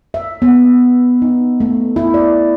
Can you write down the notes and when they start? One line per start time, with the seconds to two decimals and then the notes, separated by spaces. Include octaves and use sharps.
0.14 E5
0.42 B3
1.22 D#4
1.60 A3
1.96 E4
2.14 D5